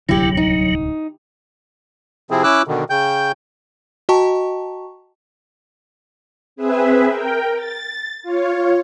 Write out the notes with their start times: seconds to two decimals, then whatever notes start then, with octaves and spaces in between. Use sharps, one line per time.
0.09 D1 C2 D3 F#3 E4 G4
0.37 D#4
2.31 C3 F3 C4 E4 G#4
2.44 C#4 E4 D6 E6 F#6
2.67 B2 D3 D#3
2.90 C#3 G5 G6
4.09 F#4 D#5 G5 A5 A#5 C#6
6.56 C4 G#4 B4 E5
7.09 A#4 G5
7.56 A6
8.23 F4 C#5